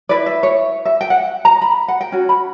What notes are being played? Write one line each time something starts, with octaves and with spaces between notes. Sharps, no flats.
E4 B4 D5
E5
C#5
E5
G5
F#5
A#5
B5
F#5
G5
C#4 F#4
B5